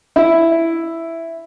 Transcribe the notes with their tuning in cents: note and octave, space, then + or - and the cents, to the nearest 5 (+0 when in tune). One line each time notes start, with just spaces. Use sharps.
E4 +5